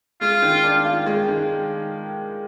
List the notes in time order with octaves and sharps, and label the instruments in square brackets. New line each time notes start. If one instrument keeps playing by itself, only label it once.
[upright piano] G#3 [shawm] F4
[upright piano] D#3
D4
F4
G#3
D#3